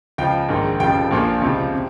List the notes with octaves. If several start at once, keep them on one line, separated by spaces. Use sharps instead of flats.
C#2 C#3 F3 G5
A#1 G#2 D#3
F1 F2 C#3 F3 G5
A#1 A#2 F3
C#2 C3 F3
C3